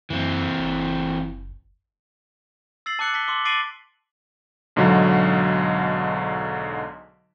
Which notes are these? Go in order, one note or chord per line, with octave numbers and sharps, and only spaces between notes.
F#2 E3 C4
F#1
E6 A6 C7 F#7
A5 D6 F#6 C#7 F#7
A5 B6 G7
C6 D6 G7
D6 A6 C7 D7 D#7 F#7
B1 G#2 D3 F#3